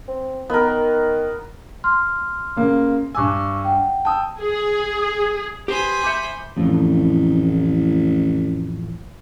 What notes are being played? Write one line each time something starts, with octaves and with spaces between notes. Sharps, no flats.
C4
D#3 B3 A#4
C6 F6
C#3 A#3
G2 G#5 C#6 D6 E6
F#5 G5
G5 A5 D#6 E6
G#4
G4 G#4 B4 C5 B5
E5 G#5 D6 G6 C#7
A1 F2 A2 E3